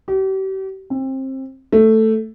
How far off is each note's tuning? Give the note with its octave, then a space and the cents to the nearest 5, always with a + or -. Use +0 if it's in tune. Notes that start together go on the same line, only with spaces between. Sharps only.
G4 -40
C4 +25
A3 +5